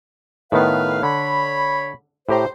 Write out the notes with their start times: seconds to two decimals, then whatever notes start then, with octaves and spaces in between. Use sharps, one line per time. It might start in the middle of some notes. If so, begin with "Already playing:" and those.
0.52 A2 D#3 B3 B4 F5
1.03 D3 C#5 B5
2.29 A2 G4 C5 A#5